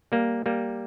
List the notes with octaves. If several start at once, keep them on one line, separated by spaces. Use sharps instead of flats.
G3 A#3
G3 A#3